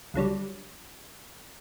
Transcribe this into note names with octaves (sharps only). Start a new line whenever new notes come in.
C#2 D3 F#3 G3